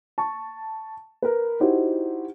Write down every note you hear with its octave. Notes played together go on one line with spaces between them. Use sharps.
A5 C#6
A#4 B4
D#4 E4 F#4 G4 C5